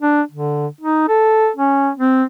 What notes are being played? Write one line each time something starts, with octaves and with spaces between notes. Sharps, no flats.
D4
D3
D#4
A4
C#4
C4